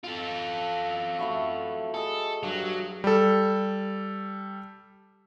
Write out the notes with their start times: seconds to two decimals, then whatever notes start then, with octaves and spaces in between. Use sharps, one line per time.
0.04 F4 A4
1.19 A3 E4 F#4
1.94 G#4 A4 D#5
2.43 G2 F#3
3.04 G3 A4